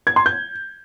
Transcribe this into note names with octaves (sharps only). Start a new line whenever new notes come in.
G#6
C6
G6